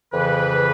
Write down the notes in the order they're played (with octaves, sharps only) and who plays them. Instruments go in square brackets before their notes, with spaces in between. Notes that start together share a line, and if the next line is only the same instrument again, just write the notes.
[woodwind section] F2 C#3 E3 B4